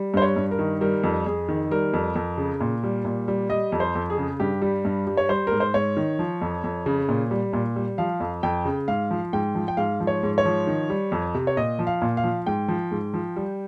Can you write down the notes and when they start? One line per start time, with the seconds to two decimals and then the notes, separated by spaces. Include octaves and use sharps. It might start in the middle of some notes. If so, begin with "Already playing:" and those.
Already playing: G3
0.14 G2 C5
0.22 C#5
0.36 G2
0.51 A#4
0.59 D#3
0.81 G3 A#4
1.04 F2
1.26 F2 G#4
1.49 D#3
1.71 G3 A#4
1.94 F2
2.16 F2
2.38 C#3
2.61 A#2
2.83 G3
3.05 A#2
3.28 G3
3.50 G3 D#5
3.72 F2
3.80 C5
3.95 F2
4.10 G#4
4.18 C#3
4.40 G2 G4
4.62 G3
4.85 G2
5.07 G3
5.17 C#5
5.29 G3 C5
5.47 G#2 A#4
5.60 C5
5.74 G#2 C#5
5.97 D#3
6.19 F3
6.42 F2
6.64 F2
6.86 C#3
7.09 A#2
7.31 G3
7.53 A#2
7.76 G3
7.98 F3 F5
8.20 F2
8.43 F2 G5
8.65 C#3
8.88 G#2 F5
9.11 F3
9.33 G#2 G5
9.55 F3
9.68 G5
9.77 G#2 F5
10.00 F3
10.07 C#5
10.23 G#2
10.38 C#5
10.45 F3
10.67 D#3
10.90 G3
11.12 F2
11.35 C3
11.47 C#5
11.57 A#2 D#5
11.79 F3
11.87 F5
12.02 A#2
12.17 F5
12.24 F3
12.46 G#2 G5
12.68 F3
12.91 G#2
13.14 F3
13.36 G3